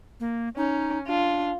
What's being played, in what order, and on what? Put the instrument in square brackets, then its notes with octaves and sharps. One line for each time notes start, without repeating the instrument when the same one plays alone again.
[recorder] A#3
[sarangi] C#4 [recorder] D#4
[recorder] D4 [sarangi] F4